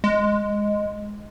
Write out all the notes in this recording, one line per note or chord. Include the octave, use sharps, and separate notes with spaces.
G#3